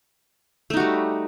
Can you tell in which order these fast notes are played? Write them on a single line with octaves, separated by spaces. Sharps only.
A3 D#4 F#4 G3